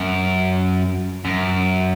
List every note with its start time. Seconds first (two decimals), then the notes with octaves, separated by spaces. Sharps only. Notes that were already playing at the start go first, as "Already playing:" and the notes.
Already playing: F#2
1.25 F#2